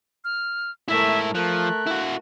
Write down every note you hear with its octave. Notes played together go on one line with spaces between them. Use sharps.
F6
G#2 A3 E4 A#4 E5
F3 A3 A#4 F#6
E4 F#4